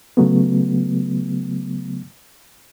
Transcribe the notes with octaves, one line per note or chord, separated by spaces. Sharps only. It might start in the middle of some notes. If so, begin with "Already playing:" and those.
C#3 F#3 A3 B3